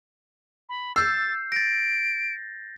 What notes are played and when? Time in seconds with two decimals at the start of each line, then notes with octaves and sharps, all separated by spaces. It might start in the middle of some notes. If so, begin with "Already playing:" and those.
0.69 B5
0.96 E6 G6 A6 C7
1.52 A6 A#6 D7